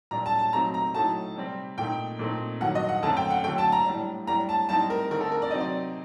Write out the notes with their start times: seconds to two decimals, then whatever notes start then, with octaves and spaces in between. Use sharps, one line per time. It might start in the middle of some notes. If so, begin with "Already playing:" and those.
0.11 A#2 G3 D4 A#5
0.26 A5
0.39 A5
0.53 C3 F#3 A3 C4 D#4 A#5
0.74 A#5
0.94 A2 F#3 A3 D#4 A5
1.36 C3 G3 C4
1.78 A#2 A3 D#4 G5
2.19 A#2 A3 C4 D#4
2.61 G2 D#3 F#3 F#5
2.75 D#5
2.89 F#5
3.03 F#2 D3 A3 C4 A5
3.17 G5
3.30 F#5
3.44 D3 F#3 A3 G5
3.58 A5
3.72 A#5
3.86 A2 G3 D4
4.27 A2 G3 D4 A#5
4.49 A5
4.69 A2 G3 C4 D#4 A5
4.90 A#4
5.10 D3 A3 C4 D#4 A#4
5.21 A4
5.32 A#4
5.42 D5
5.51 C3 F#3 C4 D#4 D#5
5.61 D5